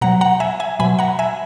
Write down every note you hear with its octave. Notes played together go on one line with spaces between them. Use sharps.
B2 F#3 F#5 A#5
F#5 A#5
E5 G#5
E5 G#5
B2 F#3 G#5 B5
F#5 A#5
E5 G#5